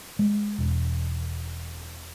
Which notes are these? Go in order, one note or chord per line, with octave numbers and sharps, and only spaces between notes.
G#3
E1